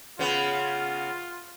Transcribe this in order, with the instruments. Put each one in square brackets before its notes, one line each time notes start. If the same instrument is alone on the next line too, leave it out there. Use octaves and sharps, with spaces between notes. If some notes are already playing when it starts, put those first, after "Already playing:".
[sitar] C#3 B3 [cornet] F4